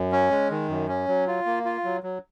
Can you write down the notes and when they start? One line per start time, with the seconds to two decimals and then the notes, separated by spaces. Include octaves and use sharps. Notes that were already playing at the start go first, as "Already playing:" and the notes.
Already playing: F#2
0.12 C#4
0.31 G#3
0.51 D#3
0.69 F#2
0.88 C#4
1.08 F#3
1.27 F4
1.46 A#3
1.65 F4
1.84 F#3
2.03 F#3